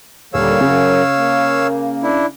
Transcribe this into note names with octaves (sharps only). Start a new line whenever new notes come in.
D#1 D3 G3 A#3 C#5 F5 E6
F#2 C#3 F#3
A#3
D4 E4